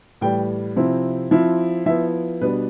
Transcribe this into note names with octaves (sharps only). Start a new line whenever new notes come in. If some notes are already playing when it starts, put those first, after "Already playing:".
A2 E3 G3 G5
C3 F3 C4 E4
F3 C4 E4
F3 B3 E4 E5
B2 G3 B3 D4 B4